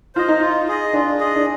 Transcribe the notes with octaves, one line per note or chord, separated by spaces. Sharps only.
F4 C5 D#5
D#4
F4
G#4 D#5
D4 F4
G#4 D#5
D4